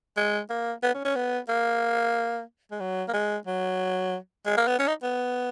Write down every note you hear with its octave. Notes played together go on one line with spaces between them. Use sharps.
G#3
A#3
B3
C#4
C#4
B3
A#3
G#3
F#3
A#3
G#3
F#3
G#3
A#3
B3
C#4
D#4
B3